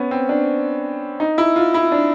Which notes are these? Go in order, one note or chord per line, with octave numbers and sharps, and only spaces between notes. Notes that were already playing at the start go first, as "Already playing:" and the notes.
Already playing: B3 C#4
C4
D4
D#4
E4
F4
E4
D4